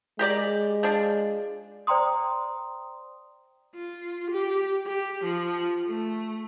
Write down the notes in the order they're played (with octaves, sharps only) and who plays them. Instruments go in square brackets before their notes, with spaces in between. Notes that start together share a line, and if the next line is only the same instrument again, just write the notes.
[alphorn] G#3 [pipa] G4 A#4 D5
[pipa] F3 D4
[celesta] C5 D5 G5 A#5 C6 D#6
[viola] F4
G4
G4
F3
A3